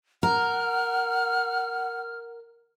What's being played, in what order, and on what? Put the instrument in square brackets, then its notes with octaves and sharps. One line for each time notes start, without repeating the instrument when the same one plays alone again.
[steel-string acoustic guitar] A#4 [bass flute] F#5 [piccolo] F6